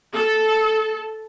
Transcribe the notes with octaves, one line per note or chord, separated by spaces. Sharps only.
A4